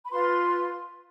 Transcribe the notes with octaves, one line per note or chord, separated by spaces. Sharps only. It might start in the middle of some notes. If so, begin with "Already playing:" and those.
B5
F4 B4 C6